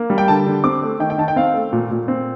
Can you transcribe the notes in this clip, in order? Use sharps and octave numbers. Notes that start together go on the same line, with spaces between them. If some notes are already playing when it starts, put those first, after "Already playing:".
Already playing: A#3
G3
G5
D3 A5
D3
C4 D6
A3
D#3 G5
G5
D#3 A5
G5
C4 F5
A3
A#2
A#2
C4